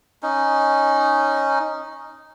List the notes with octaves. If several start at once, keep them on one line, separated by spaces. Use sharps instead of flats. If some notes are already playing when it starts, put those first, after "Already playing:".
C#4 D#4